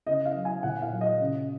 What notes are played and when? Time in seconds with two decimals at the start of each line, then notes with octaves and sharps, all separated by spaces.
0.06 C#3 D#5
0.25 F5
0.35 F#3
0.45 G#5
0.63 A#2 F#5
0.82 F5
0.92 F#3
1.01 D#5
1.20 C#3